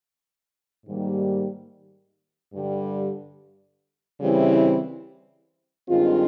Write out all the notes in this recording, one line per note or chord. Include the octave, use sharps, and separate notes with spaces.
G#2 D#3 G3 A#3
G2 D3 G3
C#3 E3 G3 C4 E4
G2 D#3 G#3 C4 F4